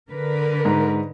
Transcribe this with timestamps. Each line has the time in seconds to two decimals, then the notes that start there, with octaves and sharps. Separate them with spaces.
0.10 D3 A#4 B4
0.65 G#2 A#5